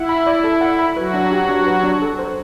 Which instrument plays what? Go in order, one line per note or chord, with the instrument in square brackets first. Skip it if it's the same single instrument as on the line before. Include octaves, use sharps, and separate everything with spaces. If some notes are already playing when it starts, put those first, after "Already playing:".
Already playing: [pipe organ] E4 [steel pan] F#5
[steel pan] B5
D5
A4
F#5
B5
[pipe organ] F#3 F#4 [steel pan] B4
[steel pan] D4
G4
D4
B4
D4
A4
C5